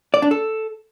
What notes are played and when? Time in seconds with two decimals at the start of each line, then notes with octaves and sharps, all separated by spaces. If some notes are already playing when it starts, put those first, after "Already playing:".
0.14 D5
0.22 D4
0.31 A4